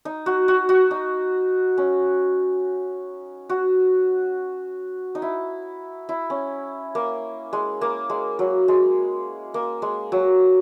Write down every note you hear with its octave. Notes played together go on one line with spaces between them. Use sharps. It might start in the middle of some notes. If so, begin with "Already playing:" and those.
D#4
F#4
F#4
F#4
D#4
C#4
F#4
D#4
E4
E4
C#4
A#3
G#3
A#3
G#3
F#3
G#3
A#3
G#3
F#3